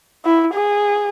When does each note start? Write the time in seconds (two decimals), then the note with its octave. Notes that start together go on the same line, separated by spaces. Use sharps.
0.25 E4
0.54 G#4